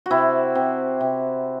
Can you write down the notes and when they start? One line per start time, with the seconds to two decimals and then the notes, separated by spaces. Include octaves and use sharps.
0.06 C3 E4 F#4
0.55 C3
1.01 C3